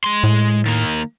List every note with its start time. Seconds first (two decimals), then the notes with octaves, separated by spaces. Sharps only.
0.04 G#3 C6
0.24 A2
0.66 D#3 A#3